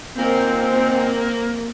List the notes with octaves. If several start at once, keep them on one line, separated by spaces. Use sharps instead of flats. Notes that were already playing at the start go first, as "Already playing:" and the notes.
A#2 D#3 A#3 C4 F4